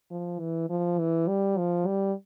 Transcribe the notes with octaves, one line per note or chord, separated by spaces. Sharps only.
F3
E3
F3
E3
G3
F3
G3